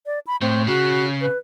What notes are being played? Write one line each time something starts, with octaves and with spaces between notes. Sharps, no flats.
D5
B5
A2 C4
C#3 F#4
B4